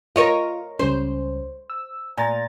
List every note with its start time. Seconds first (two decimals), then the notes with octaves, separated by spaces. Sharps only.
0.16 F4 A#4 C#5 D#5
0.79 C#2 G3 C#4 C5
1.70 E6
2.17 A#2 G#5 A#5 A6